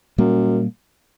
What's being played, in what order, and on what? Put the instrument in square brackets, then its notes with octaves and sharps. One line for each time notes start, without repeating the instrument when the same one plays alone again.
[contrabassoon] F#2 [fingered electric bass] A#2 G3 A#3